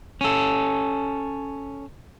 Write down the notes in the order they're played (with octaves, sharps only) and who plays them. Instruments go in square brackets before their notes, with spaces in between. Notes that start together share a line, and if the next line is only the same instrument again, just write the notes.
[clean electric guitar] C#4 A4